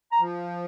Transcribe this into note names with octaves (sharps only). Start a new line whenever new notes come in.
A#5
F3